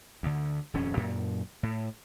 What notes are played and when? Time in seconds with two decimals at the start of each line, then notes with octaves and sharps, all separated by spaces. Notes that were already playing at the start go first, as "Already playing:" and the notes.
0.23 D2 D3
0.74 D#1 F2 C#4
0.97 F#2 A#2
1.63 A2